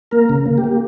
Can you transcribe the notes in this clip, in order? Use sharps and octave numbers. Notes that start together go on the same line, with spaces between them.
A#3 A#4
C#3
A#3
G4
A#3